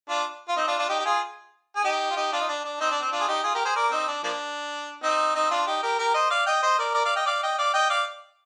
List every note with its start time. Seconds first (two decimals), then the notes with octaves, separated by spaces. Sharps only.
0.09 D4 F4
0.48 F4
0.57 C4 D#4
0.67 D4 F4
0.79 D4 F4
0.89 D#4 G4
0.99 G4
1.05 F4 G#4
1.76 G#4
1.84 D#4 G4
2.11 F4
2.16 D#4 G4
2.32 D4 F4
2.41 D#4
2.48 D4
2.64 D4
2.80 C4 D#4
2.91 D4
3.02 C4
3.12 D4 F4
3.20 G#4
3.28 D#4 G4
3.43 F4 G#4
3.54 G4 A#4
3.65 G#4 C5
3.75 A#4 D5
3.92 C4 D#4
4.08 D4
4.24 F3 A#3 D4
5.03 C4 D#4
5.35 C4 D#4
5.51 D4 F4
5.67 D#4 G4
5.83 G4 A#4
5.99 G4 A#4
6.14 C5 D#5
6.30 D5 F5
6.46 D#5 G5
6.63 C5 D#5
6.78 A#4 D5
6.94 A#4 D5
7.05 D5 F5
7.16 D#5 G5
7.26 D5 F5
7.43 D#5 G5
7.58 D5 F5
7.73 D#5 G5
7.90 D5 F5